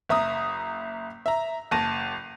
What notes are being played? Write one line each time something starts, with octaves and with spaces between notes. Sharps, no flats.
F#1 E5 A#5 D#6
E5 A#5
F#1 A5 A#6 D#7